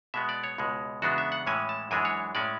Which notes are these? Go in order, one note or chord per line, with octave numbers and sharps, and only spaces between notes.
B2 G#3 B3 E5
D5
C#5
C#2 B2 G#3
E2 C#3 G#3 B3 D4 F#4
E5
F#5
A2 E3 G#3 C#4 G#5
A5
F#2 E3 G#3 D4 G#5
C#5
A2 G#3 C#4 D5